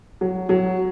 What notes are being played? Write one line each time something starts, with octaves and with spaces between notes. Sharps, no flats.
F#3
F#3